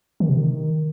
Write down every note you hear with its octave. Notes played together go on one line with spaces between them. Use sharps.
D#3
C3
D#3